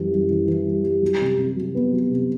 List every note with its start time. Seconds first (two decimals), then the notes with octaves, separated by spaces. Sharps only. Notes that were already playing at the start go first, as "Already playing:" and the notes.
Already playing: F#2 E3 G3
0.12 F#2
0.29 E3
0.48 E3
0.66 G3
0.84 G3
1.02 F#3
1.20 C3
1.38 C3
1.56 F#3
1.75 B3
1.92 F#3
2.10 C3